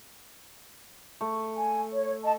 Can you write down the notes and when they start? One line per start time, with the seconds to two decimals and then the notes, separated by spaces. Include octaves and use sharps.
1.21 A3
1.56 G#5
1.93 C#5
2.23 D#5 A5